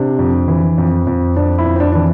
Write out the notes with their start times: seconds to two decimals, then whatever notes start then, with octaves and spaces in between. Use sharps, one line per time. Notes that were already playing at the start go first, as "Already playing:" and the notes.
Already playing: C3 D4
0.19 F2
0.48 E3
0.78 F2
1.07 F2
1.36 F2 D4
1.58 E4
1.65 F2
1.76 C4
1.80 D4
1.92 E3 D4